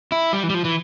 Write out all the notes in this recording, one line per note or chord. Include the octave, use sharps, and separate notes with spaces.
E4
G3
E3
G3
F3
E3